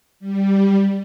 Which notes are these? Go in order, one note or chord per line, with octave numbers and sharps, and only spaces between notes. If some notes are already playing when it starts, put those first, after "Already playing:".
G3